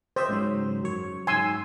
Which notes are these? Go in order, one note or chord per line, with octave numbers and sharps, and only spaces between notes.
G4 C5 D#5 E5
G#2 C#3 F#3
F#2 C#5
G#2 F#3 G#5 C6 E6